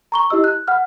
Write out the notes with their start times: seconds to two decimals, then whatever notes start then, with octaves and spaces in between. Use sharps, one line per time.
0.12 A#5 C#6 G7
0.30 E4 G4 D#5 E6
0.44 F#6
0.68 F#5 F6